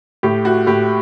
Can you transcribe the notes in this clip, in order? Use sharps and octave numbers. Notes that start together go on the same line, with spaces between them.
A2 G4
A2 F#4
A2 G4